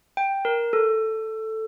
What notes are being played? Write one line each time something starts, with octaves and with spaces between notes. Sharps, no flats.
G5
A#4
A4